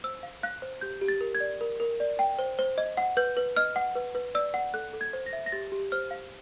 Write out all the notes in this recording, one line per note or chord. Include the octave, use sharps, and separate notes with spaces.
C5 E6
F5
F5 F#6
C5
G4 G6
G4
A6
A#4
G#6
D5
A#4
A#4
D5
G5
C5
C5
D#5
F#5
B4 G6
B4
D#5 F6
F#5
B4
B4
D5 E6
F#5
A4 F#6
A4
G#6
C5
A#6
E5
A#6
G4 A6
G4
C5 F6
F5